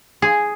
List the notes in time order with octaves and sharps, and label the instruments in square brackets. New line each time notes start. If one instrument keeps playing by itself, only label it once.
[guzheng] G#4